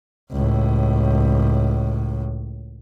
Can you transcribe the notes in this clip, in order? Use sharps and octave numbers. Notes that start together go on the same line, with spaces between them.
C#2 A2